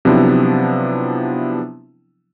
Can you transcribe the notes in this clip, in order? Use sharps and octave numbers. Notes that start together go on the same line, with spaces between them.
C3 F3 F#3 B3 D4 E4